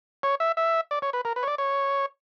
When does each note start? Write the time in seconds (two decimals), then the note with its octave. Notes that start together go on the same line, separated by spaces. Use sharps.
0.23 C#5
0.40 E5
0.57 E5
0.91 D5
1.02 C#5
1.13 B4
1.25 A#4
1.36 B4
1.43 C#5
1.47 D5
1.58 C#5